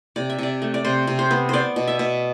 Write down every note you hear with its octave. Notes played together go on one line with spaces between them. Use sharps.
C3 D5
E5
C3 D5
A3
D5
C3 C5
C3
C5
B3
B3 C5 D5
B2
E5
B2